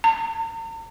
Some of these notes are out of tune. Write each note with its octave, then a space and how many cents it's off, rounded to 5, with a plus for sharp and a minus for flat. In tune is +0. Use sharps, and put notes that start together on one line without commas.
A#5 -45